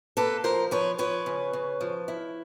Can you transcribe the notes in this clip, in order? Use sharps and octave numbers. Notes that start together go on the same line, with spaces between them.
A#3 A4 B4
F3 A#4 C5
F3 B4 C#5
F3 B4 C#5
C#3
C#3
F3
E4